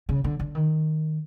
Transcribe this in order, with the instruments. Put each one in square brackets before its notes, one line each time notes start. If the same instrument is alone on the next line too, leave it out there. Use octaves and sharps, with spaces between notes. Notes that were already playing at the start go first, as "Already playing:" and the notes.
[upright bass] C#3
D3
D3
D#3